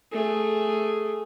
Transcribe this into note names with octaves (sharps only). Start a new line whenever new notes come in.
A3 G#4